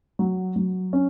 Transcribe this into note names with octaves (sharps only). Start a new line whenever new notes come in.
F#3
F#3
C#4